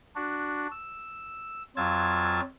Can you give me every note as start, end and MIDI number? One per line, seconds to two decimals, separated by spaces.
0.16 0.67 62
0.16 0.67 66
0.71 1.63 88
1.76 2.41 41
1.76 2.41 54
1.76 2.41 65
1.76 2.41 88
1.76 2.41 92
1.76 2.41 93